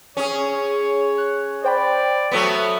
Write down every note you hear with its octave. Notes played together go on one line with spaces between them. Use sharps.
C#4 G#4 C#5
F#6
C5 D5 G5 B5
F#3 A3 B3 B6 D7